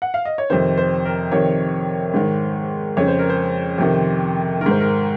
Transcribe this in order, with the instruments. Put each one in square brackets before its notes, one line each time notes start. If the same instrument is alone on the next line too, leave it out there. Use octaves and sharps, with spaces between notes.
[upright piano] F#5
F5
D#5
C#5
F2 C3 D#3 C5
C5
A#4
F2 C3 D#3 C#5
G#2 D#3
F2 C#3 C#5
C5
A#4
C5
F2 C3 D#3
D#3 A#4
G#2 C5
A#4